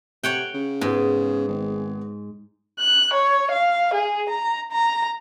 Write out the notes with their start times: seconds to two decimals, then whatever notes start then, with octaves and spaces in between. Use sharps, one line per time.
0.24 C3 C#5 F#5 G5
0.54 C#3
0.81 G#2 B3 G#4
1.48 G#1
2.79 F#6
3.13 C#5
3.51 F5
3.93 G#4
4.29 A#5
4.71 A#5